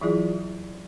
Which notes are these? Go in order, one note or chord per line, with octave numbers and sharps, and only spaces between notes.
E3 F#3 E4 F4 G#4 D5